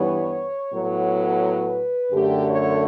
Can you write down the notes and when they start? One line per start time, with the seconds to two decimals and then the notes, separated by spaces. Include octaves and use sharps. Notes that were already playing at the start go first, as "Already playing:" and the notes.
Already playing: G2 E3 G3 B3 C#5
0.74 A2 F#3 B3
1.43 B4
2.12 F#2 D3 A3 G4
2.47 C#5